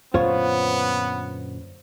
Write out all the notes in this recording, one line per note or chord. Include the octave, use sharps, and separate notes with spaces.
F#2 A#2 D3 B3 F4 C5 C#5